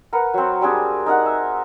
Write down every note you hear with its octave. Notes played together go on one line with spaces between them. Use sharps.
A#4 B4 F#5
F#3 C4
G3 C4 D4 G#4
D#4 A#4 F#5
E5